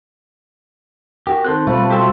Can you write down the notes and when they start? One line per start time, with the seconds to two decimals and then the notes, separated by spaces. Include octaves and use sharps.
1.27 F#4 G4 A#4
1.44 D#3 C4 A4 C5 A5 F#6
1.67 B2 F3 G3 A3 B4
1.90 F#4 G4 E5 C6